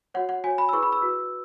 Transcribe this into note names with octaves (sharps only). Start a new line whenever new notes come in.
F#4 C#5 F#5
F#5
F#4 C#5 G#5
B5
E6
E4 G#4 B4 C#6
B5
E6
F#4 B4